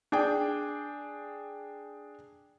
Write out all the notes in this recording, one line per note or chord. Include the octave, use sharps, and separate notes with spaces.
D4 G#4 G5